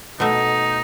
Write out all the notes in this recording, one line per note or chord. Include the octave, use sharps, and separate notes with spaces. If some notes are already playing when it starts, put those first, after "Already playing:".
B2 A3 D#4